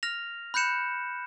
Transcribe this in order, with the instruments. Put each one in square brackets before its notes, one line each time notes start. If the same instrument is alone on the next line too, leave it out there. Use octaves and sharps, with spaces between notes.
[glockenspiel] F6 A#6 F7
B5 F#6 G6 C#7 E7